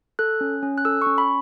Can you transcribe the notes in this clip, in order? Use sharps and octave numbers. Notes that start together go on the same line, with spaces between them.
A4 F#6
C#4
C#4
F#6
A4 E6
C#6
C#4
B5